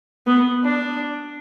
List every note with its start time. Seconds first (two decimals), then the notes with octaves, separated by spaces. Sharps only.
0.27 B3
0.64 D4